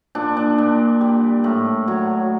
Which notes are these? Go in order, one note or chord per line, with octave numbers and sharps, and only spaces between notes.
A#2 D4
D4
A#2
G3
A2
F#3